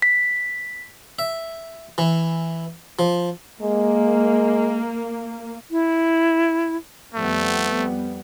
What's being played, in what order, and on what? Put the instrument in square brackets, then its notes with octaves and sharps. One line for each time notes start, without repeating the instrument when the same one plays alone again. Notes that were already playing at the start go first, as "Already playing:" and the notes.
[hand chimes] B6
[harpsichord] E5
E3
F3
[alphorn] G#3 [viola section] A#3
[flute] E4
[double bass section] F2 G3 B3 [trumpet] A3